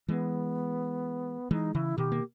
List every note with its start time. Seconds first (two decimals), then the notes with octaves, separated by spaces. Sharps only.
0.08 E3 G#3 B3
1.51 E3 G#3 D#4
1.74 C#3 E3 E4
1.98 B2 D#3 G4
2.12 A#3